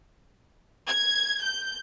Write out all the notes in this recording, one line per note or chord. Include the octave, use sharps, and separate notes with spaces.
G#6
G6